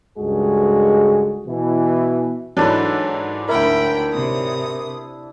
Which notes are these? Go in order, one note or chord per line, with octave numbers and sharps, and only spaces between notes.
C#2 G2 G#3 F#4 G#4 A4
B2 E3
G#2 E3 F#3 D4 A4 B4
D2 E4 A#4 G5 B5
C3 D#6